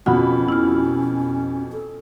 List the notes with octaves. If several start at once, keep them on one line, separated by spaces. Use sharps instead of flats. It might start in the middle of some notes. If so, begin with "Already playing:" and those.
F2 B2 C#4 F4 F#4 F#5 B5
E4 F6
A4